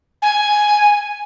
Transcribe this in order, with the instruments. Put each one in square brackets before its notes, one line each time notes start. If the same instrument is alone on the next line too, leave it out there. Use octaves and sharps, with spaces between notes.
[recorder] G#5